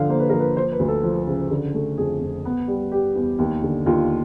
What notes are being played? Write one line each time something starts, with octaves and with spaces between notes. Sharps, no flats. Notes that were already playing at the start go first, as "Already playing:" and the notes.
Already playing: D3 F3 F5
A#3 C5
B4
F3 A#4
B4
F3 C5
B4
D2
A4
F3
C#3
D3
A3
F2 G#4
F2
B3
G3
G3 G4
E2
D#2
D3
D#2 F4